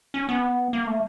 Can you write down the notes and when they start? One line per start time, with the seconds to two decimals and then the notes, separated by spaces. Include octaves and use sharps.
0.14 C#4
0.29 B3
0.73 A#3
0.87 A3